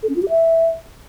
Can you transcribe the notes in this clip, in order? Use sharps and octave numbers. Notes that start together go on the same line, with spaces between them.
A4
C#4
F4
G4
E5